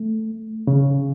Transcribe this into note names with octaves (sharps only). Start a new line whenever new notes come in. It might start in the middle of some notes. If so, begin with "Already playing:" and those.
Already playing: A3
C#3